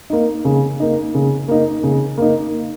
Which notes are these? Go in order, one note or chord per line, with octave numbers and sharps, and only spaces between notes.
A#3 D#4
C#3
A#3 D#4
C#3
A#3 D#4
C#3
A#3 D#4